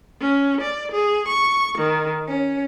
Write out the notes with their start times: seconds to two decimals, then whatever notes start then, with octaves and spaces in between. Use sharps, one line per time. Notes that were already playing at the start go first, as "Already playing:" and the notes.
0.20 C#4
0.60 D5
0.90 G#4
1.28 C#6
1.77 D#3
2.27 C#4